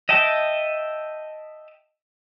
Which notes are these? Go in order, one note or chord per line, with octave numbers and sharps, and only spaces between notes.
D#5 E5 G5 A5